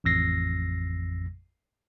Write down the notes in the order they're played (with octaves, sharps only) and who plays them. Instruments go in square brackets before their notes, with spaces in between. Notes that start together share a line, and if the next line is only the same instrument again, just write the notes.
[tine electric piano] A1 F2 E6 A#6 C7